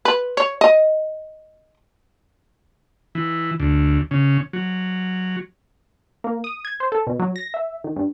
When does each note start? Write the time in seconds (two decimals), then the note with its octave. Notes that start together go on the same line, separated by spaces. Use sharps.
0.05 B4
0.37 C#5
0.61 D#5
3.15 E3
3.60 D2
4.11 C#3
4.53 F#3
6.24 A#3
6.44 D#6
6.65 G#6
6.80 C5
6.92 A4
7.07 B2
7.20 F#3
7.36 A#6
7.54 E5
7.84 D#3
7.96 G2